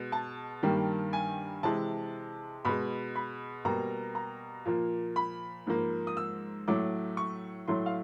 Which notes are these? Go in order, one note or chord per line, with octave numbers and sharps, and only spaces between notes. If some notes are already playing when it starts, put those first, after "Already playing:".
Already playing: B2 G#3
A5
G2 D#3 G3 A#3
G#5
C3 E3 G#3 A5
B2 G#3 B5
B5
B2 G3 A#3 A#5
A#5
A#2 F3 A#3
B5
G#2 F3 A#3
D#6
E6
A2 F#3 A3 D6
C#6
A2 F#3 A3 C6
F5